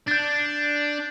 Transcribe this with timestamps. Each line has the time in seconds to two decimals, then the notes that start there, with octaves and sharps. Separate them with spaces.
0.08 D4 G6 A6